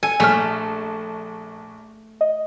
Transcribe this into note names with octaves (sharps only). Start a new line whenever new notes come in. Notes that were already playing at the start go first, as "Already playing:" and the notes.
A4 G#5
A#1 A3 F6
D#5